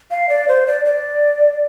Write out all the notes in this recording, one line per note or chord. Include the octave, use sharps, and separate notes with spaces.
F5
D5
C5
D5
D5